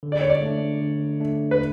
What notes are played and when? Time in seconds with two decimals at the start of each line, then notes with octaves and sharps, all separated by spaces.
0.03 D3
0.12 D5
0.21 C#5
0.30 D5
0.42 A3 D4
0.81 D3
1.20 A3 D4
1.51 B4